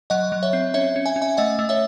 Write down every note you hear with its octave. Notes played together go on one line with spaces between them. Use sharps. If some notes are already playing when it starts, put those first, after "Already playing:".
F#3 D#5 F#5
F#3
C#5 E5
C4
C#4 C#5 E5
C#4
E5 G#5
C#4
E5 G#5
A3 D#5 F#5
A3
C#5 E5